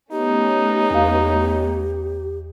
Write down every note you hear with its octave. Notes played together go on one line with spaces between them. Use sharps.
A3 B3 C#4 D#4 G4
E2 F5